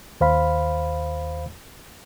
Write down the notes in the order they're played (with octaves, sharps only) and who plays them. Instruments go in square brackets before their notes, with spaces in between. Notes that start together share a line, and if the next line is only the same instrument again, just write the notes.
[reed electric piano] D#2 C5 F5 B5